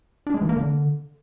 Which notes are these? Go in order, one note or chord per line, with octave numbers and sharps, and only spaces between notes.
D4
G#3
E3
A#3
D3